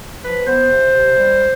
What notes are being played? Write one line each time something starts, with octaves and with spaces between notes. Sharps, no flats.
F3 B4
B3 C5
C3
C3
G3